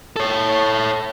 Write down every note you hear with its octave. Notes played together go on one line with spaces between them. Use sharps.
A4 C#5